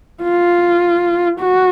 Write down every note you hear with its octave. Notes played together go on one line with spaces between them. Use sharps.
F4
F#4